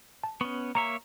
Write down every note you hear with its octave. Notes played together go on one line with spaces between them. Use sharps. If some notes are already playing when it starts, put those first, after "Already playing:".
A5
B3 C#4 C#6
A#3 C#5 E5 A#5